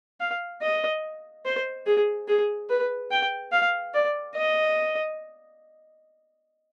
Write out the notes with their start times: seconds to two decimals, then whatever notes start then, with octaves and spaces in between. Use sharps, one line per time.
0.21 F5
0.62 D#5
1.46 C5
1.87 G#4
2.28 G#4
2.70 B4
3.12 G5
3.52 F5
3.94 D5
4.36 D#5